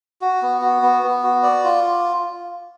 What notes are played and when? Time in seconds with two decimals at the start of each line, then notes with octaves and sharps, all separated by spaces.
0.21 F#4
0.42 B3
0.62 F#4
0.82 B3
1.03 B3
1.23 F#4
1.43 D5
1.64 F4